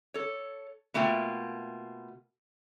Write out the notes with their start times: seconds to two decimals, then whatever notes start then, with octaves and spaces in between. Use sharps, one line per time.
0.14 A4 C#5
0.94 B2 A3 A#3 F4 G5